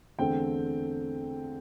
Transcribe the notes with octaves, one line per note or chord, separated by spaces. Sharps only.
E2 D3 A3 C4 G5